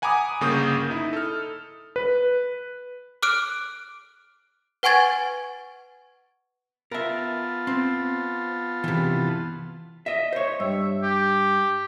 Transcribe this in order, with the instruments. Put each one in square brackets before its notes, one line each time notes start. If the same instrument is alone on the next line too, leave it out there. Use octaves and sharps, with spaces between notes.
[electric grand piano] F#5 G#5 A#5 B5 D6 D#6
G1 C#3 A#3 C#6 D#6 G6
D#4 E4
A4 F6
B4
[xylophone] D6 F6 F#6 D7
B4 F#5 G#5 C#6 G#6 A6
[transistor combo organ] B3 F4 A5 [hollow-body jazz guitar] A#4 E5
[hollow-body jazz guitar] C4
C3 E3
D#5 E5
C5 C#5
[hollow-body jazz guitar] G2 [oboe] E5
[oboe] G4